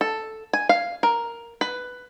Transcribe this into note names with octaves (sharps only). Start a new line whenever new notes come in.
A4
G#5
F5
A#4
B4